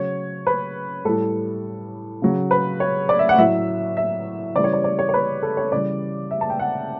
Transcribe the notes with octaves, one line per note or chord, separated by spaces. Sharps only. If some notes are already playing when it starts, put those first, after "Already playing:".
Already playing: C#3 F#3 C#5
B4
A2 G3 A4
C#3 F#3
B4
C#5
D5
E5
F#5
A2 F#3 E5
E5
C#3 E3 G3 D5
C#5
D5
D5
C#5
C#5
B4
A4
C#5
C#3 E3 G3 D5
E5
A5
G5
F#5